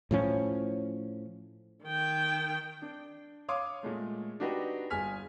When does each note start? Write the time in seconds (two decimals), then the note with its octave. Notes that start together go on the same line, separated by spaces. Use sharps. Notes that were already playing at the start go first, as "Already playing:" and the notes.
0.11 A2 F3 C#4
1.84 D#3 G5
2.82 D4
3.49 C#5 F5 C6 D6 D#6
3.83 A#2 G#3 A3
4.40 D4 D#4 F#4 G4 B4 D#5
4.90 G1 G#4 G#5 F6 B6